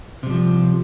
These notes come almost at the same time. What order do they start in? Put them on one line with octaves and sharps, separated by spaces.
C3 G3 F3